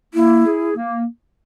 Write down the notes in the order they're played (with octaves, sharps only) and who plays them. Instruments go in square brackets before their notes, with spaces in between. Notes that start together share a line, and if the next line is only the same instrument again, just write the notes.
[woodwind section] A#3 [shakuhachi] E4
[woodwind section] G#4
A#3